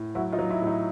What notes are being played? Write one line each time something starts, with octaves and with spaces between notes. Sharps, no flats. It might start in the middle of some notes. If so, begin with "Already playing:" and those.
Already playing: A2
F#3 E4 F#4
D#4 F4
F#3
E4
A2
D#4